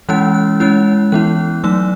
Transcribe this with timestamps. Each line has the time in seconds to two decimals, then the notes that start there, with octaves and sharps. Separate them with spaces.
0.09 E3 G#3 C#4 E4 F#6
0.34 F#6
0.60 G#3 C#4 E4 F#6
1.12 E3 B3 E4 F#6
1.64 F#3 A3 D#4 E6